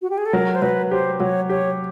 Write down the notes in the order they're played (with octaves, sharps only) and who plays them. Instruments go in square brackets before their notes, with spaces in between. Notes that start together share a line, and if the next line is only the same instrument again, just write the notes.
[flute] F#4
G4
G#4
A4
[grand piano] F#3 [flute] A#4
[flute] C5
[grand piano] F#3 [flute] B4
[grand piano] G4 [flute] C5
[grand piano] F#3 [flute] C#5
[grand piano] G4 [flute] C#5